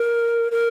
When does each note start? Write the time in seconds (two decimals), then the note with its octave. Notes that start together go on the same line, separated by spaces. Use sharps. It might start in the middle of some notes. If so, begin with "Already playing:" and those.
Already playing: A#4
0.52 A#4